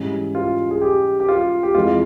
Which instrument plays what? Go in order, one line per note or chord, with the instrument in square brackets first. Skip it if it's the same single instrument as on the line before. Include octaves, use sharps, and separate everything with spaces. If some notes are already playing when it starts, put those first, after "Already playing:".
Already playing: [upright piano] G#2 E3 G3 C#4
[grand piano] F4
G#4
G4
G4
F4
G4
[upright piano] F2 E3 G#3 C4 [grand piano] F4